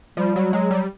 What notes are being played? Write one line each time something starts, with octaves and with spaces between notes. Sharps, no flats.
F3 G3
F#3
F#3 G#3
G3